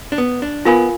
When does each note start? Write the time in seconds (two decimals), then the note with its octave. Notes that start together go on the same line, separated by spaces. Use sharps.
0.12 D4
0.18 B3
0.42 D4
0.65 B3 F4 A#4 F5 G#5 B5